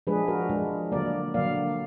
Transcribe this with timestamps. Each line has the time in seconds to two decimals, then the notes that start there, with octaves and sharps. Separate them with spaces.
0.07 F3 G#3 D4 G#4 B4
0.28 F#4 A#4
0.50 F3 G#3 D4
0.92 D3 F#3 A#3 A#4 D5
1.34 D3 F#3 A#3 D5 F5